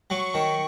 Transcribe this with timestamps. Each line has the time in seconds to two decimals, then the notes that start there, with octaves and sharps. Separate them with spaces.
0.10 F#3 C#6
0.34 D#3